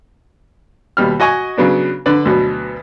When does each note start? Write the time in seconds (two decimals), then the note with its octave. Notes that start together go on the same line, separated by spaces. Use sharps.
0.97 D#2 B2 G3 F6
1.20 F#4 D#5 G#5 C#6
1.57 C#3 F#3 B3 D4
2.06 D3 D4 B4 D5
2.25 D2 B2 F#3 B3